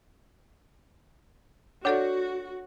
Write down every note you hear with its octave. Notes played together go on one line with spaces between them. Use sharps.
D4 F#4 A4 C#5 D5 F#5